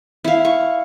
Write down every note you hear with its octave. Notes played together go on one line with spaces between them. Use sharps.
E4 F5
C#6